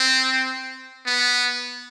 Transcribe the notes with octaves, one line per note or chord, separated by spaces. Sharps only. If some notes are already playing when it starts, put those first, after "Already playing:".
Already playing: C4
B3